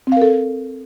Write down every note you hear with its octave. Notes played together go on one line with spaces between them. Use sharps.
C4 A4 A#4 F5